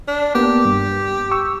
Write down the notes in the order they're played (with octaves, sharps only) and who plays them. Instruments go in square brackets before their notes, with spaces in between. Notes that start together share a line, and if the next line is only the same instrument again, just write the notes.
[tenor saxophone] D4
[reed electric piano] A#3 B3 [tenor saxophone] G4
[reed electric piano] G2
C#6 E6